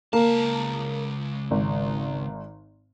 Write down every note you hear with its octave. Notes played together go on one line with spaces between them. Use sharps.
C#2 A#3 A5
G#1